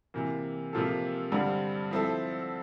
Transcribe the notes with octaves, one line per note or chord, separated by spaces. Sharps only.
C3 E3 A#3
C3 F3 A#3 F4 A4
G2 D3 G3 C4
F3 C4 E4 A4